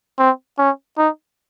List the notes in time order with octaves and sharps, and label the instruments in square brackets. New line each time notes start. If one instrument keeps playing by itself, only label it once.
[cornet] C4
C#4
D#4